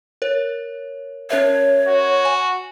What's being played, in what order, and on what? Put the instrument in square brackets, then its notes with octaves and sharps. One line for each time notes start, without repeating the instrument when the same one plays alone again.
[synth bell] A#4 C#5
[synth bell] C#4 A#4 E5 [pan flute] C#5
[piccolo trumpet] F#4
[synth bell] G#5